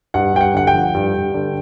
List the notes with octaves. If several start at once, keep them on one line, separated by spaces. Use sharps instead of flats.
G2 F#5
G2 G5
F#5
D3 F#5
G5
F3
G2
G2
D3